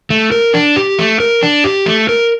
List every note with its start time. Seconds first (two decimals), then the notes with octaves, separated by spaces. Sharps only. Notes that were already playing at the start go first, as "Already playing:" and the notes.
0.10 A3
0.32 A#4
0.54 D4
0.76 G4
0.99 A3
1.20 A#4
1.43 D4
1.64 G4
1.86 A3
2.09 A#4